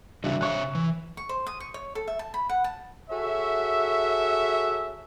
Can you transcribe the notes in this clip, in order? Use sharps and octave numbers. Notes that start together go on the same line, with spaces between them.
C#3 E3 G3 D4 F#4 E5
C3 C#5 E5 C#6 F#6
E3
C#6
C5
D#6
C#6
C#5
A4
E5
A5
B5
F#5
A5
F#4 G#4 A4 C#5 E5